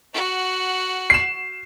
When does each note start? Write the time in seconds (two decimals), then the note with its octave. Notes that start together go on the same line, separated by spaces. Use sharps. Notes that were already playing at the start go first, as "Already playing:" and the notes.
0.14 F#4 F#5
1.10 C7 E7